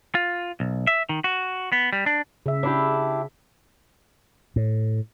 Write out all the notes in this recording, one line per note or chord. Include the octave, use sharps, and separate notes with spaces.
F4
B1
E5
D#3
F#4
B3
G3
D4
C#3 E5
D4 E4 G4
A2